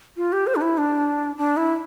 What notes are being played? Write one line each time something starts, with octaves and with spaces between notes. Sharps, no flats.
F4
G4
C5
D4
E4
D4
D4
E4